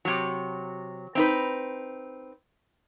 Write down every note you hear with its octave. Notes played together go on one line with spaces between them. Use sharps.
C3 F#3
C4 D#4 B4